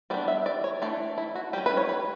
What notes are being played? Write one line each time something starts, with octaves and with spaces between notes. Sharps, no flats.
G3 B3 D4 D5
E5
D5
C#5
E3 A3 D4 D5
E4
F#4
G3 C#4 G4
B4
C#5
B4